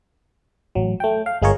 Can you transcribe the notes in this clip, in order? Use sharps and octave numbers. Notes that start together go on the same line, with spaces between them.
A1 F#3
A3 G5
F5
G1 G#3 F4 G#4 A#4 C#5